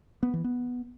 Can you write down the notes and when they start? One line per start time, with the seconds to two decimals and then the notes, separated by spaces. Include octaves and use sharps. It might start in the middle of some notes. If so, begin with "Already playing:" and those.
0.23 B3
0.33 E3
0.44 B3